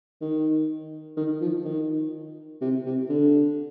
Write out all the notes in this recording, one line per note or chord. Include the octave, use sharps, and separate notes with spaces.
D#3
D#3
F3
D#3
C3
C3
D3